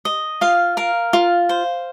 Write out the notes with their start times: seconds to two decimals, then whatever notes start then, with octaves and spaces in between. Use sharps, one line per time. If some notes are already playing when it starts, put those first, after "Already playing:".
0.05 D#5
0.41 F4 F5
0.77 A#4 F5
1.13 F4
1.49 C5